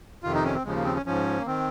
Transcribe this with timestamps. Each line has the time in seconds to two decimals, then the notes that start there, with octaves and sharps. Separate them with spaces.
0.23 F2 C3 D#3 F4
0.35 D#4
0.45 C#4
0.54 C4
0.64 D#2 C#3 F3 G#3
0.75 A#3
0.84 C4
0.96 C#4
1.06 G#2 F3 C#4
1.38 A#3
1.46 D#3 C4